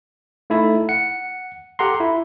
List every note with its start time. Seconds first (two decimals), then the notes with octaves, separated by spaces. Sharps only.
0.50 A3 D#4 E4 A4
0.89 F#5 C#7
1.79 G4 A4 F#5 A#5 C6
2.00 E4